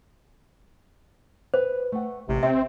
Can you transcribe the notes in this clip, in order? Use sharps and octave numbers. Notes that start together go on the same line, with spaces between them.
B4 C5
A3 F#5
A1 C3 A3
C4 E5